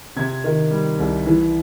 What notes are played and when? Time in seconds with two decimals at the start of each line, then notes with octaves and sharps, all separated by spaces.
0.16 C3 G#6
0.44 D#3
0.71 G3
0.99 C2
1.26 E3